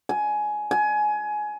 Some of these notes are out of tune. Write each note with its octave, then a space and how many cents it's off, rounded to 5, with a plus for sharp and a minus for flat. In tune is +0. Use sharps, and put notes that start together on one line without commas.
G#5 +15
G#5 +20